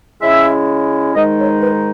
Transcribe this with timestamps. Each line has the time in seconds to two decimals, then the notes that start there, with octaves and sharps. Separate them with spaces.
0.22 C#3 G#3 C#4 E4 E5
1.15 G#2 D#3 G#3 D#4 D#5
1.38 C#5
1.61 B4